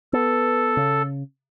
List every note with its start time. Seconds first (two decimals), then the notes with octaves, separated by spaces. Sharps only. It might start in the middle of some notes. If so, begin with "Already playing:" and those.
0.13 B3 A4
0.77 C#3